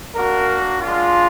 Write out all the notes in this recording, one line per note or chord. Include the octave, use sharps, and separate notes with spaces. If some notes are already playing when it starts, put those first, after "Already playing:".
A#3 D4 F#4 A#4
G#3 D4 F4